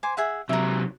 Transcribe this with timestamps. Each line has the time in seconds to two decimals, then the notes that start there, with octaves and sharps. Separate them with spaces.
0.03 C5 G#5 D6
0.17 G#4 E5 F#5
0.49 C3 F#3 A#4 E5